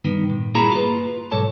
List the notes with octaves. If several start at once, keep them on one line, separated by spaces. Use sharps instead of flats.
G2 D#3 B3
A#2
G2 A#3 E4 G#4 A#5 B5
F4 B4
B1 G#2 A4 C#5 A5